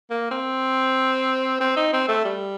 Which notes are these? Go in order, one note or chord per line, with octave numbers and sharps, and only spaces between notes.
A#3
C4
C4
D#4
C4
A3
G3